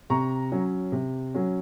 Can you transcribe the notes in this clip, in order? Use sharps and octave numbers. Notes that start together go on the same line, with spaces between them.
C3 A#5 C#6
F#3 C#4
C3
F#3 C#4